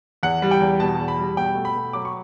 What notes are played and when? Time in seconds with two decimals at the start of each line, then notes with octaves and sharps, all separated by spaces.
0.23 E2 F#5
0.42 G3
0.51 G5
0.60 E2
0.80 B2 A5
0.99 E2
1.08 B5
1.18 G3
1.37 B2 G5
1.55 A3
1.65 B5
1.75 B2
1.93 F#3 D6
2.05 C#6